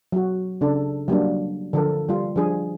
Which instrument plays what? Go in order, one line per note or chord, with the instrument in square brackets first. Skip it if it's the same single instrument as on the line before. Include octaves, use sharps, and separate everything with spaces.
[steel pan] F#3 F#4
C#3 D4 A4
F#3 G3 A#3 D4
D3 F3 A4 A#4
G3 F4
F3 G3 D4 G#4